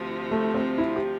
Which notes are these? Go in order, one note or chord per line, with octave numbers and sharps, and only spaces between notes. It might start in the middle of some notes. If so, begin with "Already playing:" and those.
Already playing: D2 C3 F3
A3
C4
E4
G4